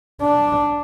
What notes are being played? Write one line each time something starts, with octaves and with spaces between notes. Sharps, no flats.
D4